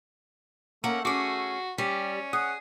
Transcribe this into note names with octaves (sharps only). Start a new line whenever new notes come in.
A3 A#3 C#4 A#4 F#5
C#4 F#4 G#4 C#6 D6
G3 C#4 G4
G#4 F#5 D#6